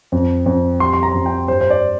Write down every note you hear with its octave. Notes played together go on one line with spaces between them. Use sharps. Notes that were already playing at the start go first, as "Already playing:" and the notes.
F2
F2
G3 C6
C6
A#5
F2
G5
G2 C5
C5
D5